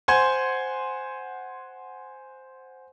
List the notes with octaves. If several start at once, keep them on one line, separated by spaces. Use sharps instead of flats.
C5 F#5 G#5 C6 G#6